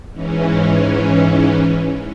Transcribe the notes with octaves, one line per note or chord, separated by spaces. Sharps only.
G#2 E3 C#4